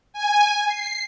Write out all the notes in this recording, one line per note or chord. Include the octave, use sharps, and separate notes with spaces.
G#5
C7